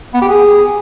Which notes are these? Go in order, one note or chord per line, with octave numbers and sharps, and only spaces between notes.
B3
G4
G#4